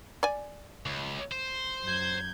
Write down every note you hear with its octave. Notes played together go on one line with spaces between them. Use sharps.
D5 G#5
C#2
C5
F#2 G6 G#6